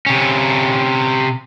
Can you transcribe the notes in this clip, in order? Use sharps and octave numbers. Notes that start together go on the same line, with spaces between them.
C3 C#4